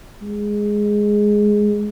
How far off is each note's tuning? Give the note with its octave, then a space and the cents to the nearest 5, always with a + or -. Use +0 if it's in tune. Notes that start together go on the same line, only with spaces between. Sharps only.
G#3 +0